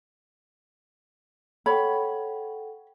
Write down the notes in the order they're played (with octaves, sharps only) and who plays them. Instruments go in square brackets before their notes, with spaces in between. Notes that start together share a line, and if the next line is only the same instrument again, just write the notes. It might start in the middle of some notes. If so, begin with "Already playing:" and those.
[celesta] A4 F#5 G5 [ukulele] C#5 B5